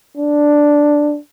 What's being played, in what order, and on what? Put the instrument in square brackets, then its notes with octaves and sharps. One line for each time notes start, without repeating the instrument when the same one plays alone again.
[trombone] D4